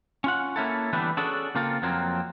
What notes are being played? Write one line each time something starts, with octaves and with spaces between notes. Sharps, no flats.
C#4 F4 F#5
A#3 C#4 E4 A4
D3 E3 G3 A3 B3 D4
C#4 D4 F#4 G#4 A4
C#3 A#3 C4 F4 A4
F2 F3 F#3 A#3 C4